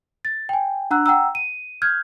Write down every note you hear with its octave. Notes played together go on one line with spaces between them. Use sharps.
A6
G5 G#5
D4 F#5 A#5 E6 F#6
F#5 G5 A#5 E6
D#7
F6 G6 G#6